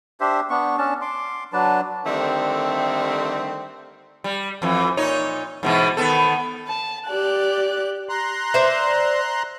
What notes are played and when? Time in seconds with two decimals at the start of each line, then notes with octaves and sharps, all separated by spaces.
0.21 D4 G4 C5 E5
0.50 B3 D4 C#6
0.78 C#4 D4 A5
1.02 C6 D6
1.53 F#3 D4 B4 A5
2.05 D3 D#3 G3 A3 C4
4.24 G3
4.62 F2 E3
4.97 A#2 D#4 C#5
5.63 G#2 B2 E3
5.97 D#3 B3 A4
6.68 A5
7.08 G4 D5 F#6
8.09 A#5 C6 F#6
8.54 C5 D5 E5